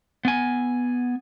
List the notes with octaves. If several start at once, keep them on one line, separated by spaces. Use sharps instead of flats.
B3 G#5